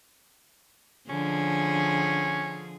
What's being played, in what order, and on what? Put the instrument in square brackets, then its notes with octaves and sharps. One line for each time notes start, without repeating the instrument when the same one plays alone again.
[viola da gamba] D3 F3 G#4 [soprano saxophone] C#4